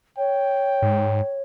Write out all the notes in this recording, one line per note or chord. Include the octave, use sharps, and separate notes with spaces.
C#5 G5
G#2